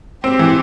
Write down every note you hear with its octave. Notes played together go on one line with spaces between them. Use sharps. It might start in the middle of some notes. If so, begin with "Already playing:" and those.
C4 G4
E3